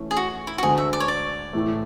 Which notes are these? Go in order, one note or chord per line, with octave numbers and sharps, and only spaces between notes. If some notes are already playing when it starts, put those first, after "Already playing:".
Already playing: E3 A3 C#4
G#4
F#4
E4
F#4
D2 D3 G#3 G#4
E5
D5
C#5
D5
A2 E3 A3